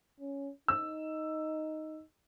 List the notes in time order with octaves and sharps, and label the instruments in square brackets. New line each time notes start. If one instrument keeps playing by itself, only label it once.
[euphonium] C#4
[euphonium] D#4 [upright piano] E6